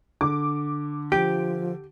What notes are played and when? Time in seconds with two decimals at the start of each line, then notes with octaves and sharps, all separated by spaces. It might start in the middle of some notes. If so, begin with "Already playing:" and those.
0.21 D3 D6
1.12 F3 G4 D7